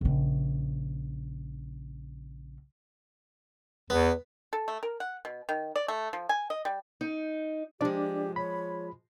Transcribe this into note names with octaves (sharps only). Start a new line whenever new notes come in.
A#1 C#3
E2 B3
A4
A3
A#4
F#5
B2
D#3
D5
A3
F3
G#5
D#5
G3
D#4
F3 G#3 D4 G4 D5
C#5 B5